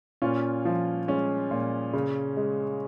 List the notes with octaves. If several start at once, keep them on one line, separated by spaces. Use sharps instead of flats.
A#2 C#4 F4
F3
G#3 C#4
A#2
C#3
G#3